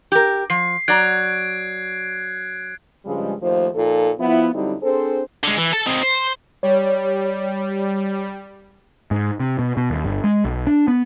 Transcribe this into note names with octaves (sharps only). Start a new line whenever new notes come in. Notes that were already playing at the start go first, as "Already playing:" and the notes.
G4 A#4
F3 C7
F#3 D5 A#5 F#6 G#6 D7
G2 C#3 F3 G3 G#3
D#2 F3 A3 D#4 C5
A#2 F3 D#4 A4
F3 B3 E4
D3 F#3 G3 C4 D#4 E4
C4 D4 G#4 A4 C5
D3 G#3
E3
A4 A5
C4 D#4
C5
G3 C#5
G#2
C3
B2
B2
D#2
G1
G#3
B1
D4
B3